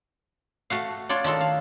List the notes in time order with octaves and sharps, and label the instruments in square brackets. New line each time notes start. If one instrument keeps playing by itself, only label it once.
[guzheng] A3 F#4 F5
D4 F4 C#5 D5
D#3 D4 F4 A4
F5